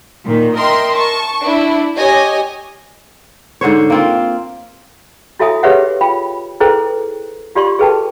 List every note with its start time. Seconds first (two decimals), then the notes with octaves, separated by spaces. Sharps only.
0.24 A#2 D#3
0.56 A#4 D#5 E5 G5 C6
0.94 A5 C#6
1.41 D4 E4
1.96 G4 C#5 D#5 G#5
3.61 G#2 D3 C5 C#5
3.90 A#3 C4 F4
5.39 E4 F#4 A4 E5 G#5 D#6
5.63 G4 G#4 B4 C#5 E5 F#5
6.01 F4 G5 B5
6.60 E4 G#4 A4 B4 C5 G5
7.55 F4 G4 D5 C6 C#6
7.79 G#4 A4 B4 G5 A5